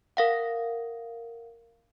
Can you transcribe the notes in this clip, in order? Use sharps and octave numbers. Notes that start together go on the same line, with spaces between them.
A#4 F5 F#5